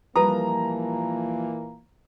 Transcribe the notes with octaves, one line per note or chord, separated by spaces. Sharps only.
A#2 E3 F3 G3 A#3 B4 A#5 D#6